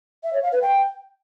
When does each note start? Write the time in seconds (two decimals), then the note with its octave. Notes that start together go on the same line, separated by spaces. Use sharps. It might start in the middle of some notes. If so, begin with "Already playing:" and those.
0.24 E5
0.33 C#5
0.43 F5
0.52 B4
0.62 G5